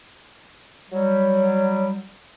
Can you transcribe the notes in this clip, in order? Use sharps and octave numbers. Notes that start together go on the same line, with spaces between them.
F#3 G3